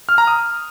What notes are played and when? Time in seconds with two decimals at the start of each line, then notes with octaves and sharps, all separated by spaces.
0.09 F6
0.18 A#5
0.27 D#6